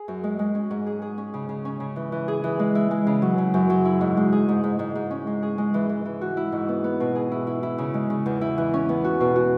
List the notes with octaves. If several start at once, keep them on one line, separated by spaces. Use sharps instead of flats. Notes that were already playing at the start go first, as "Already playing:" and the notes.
Already playing: G#4
F#2
G#3
G#3
C#4
G#2
G#4
G#4
C#4
C#3
C#3
C#4
C#3
E3
E3
G#4
E3
G#3
E4
G#3
C#3
F#3
C#3
F#2
F#3
E4
G#2
G#3
G#4
G#2
G#2
G#2
G#2
C#4
G#3
G#4
G#3
E3
E3
E3
F#4
E4
G#2
B3
B3
B2
G#4
E4
E4
E4
C#3
G#3
C#3
E2
E4
E3
C#4
B3
F#4
B2
F#4